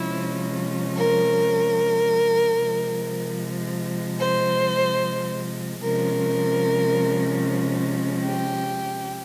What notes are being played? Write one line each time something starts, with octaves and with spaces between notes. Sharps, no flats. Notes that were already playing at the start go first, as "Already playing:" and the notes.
Already playing: C3 F3 G#3 C#4 E4
A#4
C3 F3 G#3
C5
C3 F3 G#3 C#4 A#4
G4